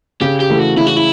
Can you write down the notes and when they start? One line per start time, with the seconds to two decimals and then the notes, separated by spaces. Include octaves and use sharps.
0.21 C#3 G4
0.40 G4
0.50 E3 A3
0.59 F#4
0.77 C#3 E4
0.87 F#4
0.96 E4